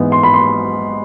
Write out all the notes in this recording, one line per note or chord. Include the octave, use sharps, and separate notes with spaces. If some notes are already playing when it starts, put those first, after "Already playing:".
Already playing: G#2 E3 B3
C6
B5
C6